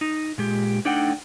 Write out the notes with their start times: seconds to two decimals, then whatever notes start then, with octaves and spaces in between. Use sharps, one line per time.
0.01 D#4
0.38 A#2 G#3 G4
0.85 A3 D4 D#4 D5 F#5 G5